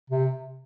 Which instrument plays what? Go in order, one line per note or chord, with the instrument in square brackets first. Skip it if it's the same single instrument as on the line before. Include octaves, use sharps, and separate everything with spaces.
[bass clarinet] C3